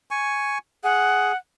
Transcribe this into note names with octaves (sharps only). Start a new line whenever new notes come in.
G#5 C#6
G#4 F#5